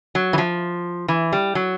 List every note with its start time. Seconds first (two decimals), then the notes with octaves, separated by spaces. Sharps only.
0.15 F#3
0.33 E3
0.38 F3
1.08 E3
1.33 G3
1.55 F#3